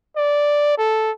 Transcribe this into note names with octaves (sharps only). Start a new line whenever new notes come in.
D5
A4